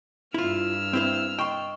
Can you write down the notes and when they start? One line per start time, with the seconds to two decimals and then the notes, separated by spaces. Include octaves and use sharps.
0.34 G2 E4 F4 E6 F6
0.93 C4 E4 C5
1.39 D#5 G5 C6 C#6